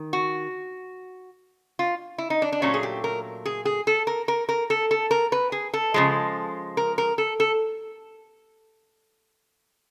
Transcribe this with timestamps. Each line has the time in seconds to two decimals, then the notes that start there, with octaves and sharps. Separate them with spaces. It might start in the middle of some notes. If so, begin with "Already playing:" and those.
Already playing: D#3
0.13 F#4
1.79 F4
2.18 E4
2.30 D#4
2.42 D4
2.52 D4
2.62 A#2 F#3 A3 C#4
2.74 G#4
2.83 G4
3.04 A#4
3.46 G#4
3.65 G#4
3.87 A4
4.07 A#4
4.28 A#4
4.49 A#4
4.70 A4
4.91 A4
5.11 A#4
5.32 B4
5.52 G#4
5.74 A4
5.94 C#3 F3 G#3
6.77 A#4
6.98 A#4
7.18 A4
7.40 A4